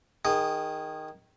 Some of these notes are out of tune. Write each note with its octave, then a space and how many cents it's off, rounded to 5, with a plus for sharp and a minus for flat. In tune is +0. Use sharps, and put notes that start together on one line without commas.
D#3 +0 G#4 -20